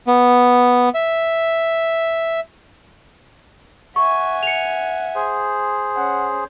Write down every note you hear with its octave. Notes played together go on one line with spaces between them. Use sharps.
B3
E5
E5 F#5 G#5 C#6
C#7 F7
G#4 C5
C#4 F#5